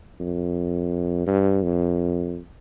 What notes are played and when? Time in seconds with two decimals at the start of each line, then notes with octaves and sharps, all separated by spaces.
0.20 F2
1.27 G2
1.63 F2